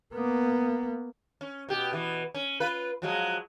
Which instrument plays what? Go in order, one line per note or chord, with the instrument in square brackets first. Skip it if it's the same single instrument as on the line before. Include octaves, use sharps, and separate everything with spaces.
[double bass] A#3 B3
[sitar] C#4
B2 G4
B2 E3
C#4
F4 B4
F3 F#3 G#3